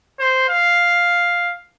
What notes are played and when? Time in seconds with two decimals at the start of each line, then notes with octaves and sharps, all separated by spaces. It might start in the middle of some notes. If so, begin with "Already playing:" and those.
0.19 C5
0.49 F5